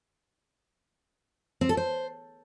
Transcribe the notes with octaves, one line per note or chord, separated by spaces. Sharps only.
C4
A4
C5